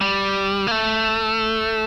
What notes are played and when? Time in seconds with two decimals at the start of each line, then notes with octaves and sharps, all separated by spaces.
0.01 G3
0.67 A#3
0.71 A3